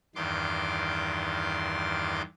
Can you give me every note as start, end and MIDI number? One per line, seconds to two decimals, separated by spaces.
0.15 2.22 40
0.15 2.22 43
0.15 2.22 51
0.15 2.22 84
0.15 2.22 86